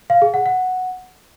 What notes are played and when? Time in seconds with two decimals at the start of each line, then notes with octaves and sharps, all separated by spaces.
0.10 F5
0.22 G#4
0.34 F#5
0.46 F#5